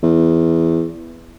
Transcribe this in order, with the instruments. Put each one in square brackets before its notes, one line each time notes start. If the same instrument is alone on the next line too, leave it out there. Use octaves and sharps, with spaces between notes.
[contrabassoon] E2